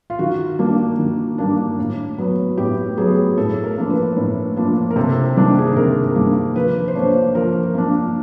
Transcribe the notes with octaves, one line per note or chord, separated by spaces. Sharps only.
F4
D#3 F#4
G3 A#3 D4
D#3
G3 A#3 D4
A2
F#3 B3
A2 G4
F#3 B3 G#4
A2 A4
A#4
F3 A#3 D4 A#4
B4
A2
F3 A#3 D4
A#4
C3 A4
D#3 G3 A#3 D4
G#4
A4
C3 A#4
D#3 G3 A#3 D4
F3 B4
C5
A#3 D4 C#5
F3 A#4
A#3 D4